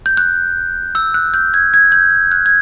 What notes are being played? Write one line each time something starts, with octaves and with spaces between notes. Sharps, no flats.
G6
F#6
E6
F#6
G6
G#6
G#6
G6
F#6
G#6